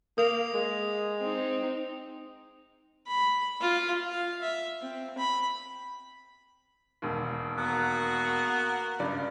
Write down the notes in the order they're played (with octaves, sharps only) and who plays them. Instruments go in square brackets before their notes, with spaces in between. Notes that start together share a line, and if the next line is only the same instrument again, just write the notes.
[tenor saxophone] A#3 [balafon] A#4 [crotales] D#6 F7
[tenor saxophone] G#3
[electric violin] C4 D#4
[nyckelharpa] B5
F4
F5
E5
C4
B5
[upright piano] E1 D#2
[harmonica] A#3 F#4 A#4 [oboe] B3
[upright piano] C#2 G2 D5